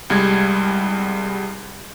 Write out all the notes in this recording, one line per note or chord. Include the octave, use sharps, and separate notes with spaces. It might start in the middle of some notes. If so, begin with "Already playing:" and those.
C2 G3 G#3 G#6